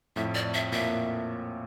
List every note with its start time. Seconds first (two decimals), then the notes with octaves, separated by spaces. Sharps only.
0.16 F2 A2 E5
0.35 D5
0.54 E5
0.72 A#2 E5